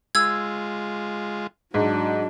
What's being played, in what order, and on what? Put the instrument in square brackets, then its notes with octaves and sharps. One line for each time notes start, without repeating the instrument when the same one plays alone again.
[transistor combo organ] G#3 F4 [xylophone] E6 G#6
[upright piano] G#2 [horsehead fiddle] F#3 D4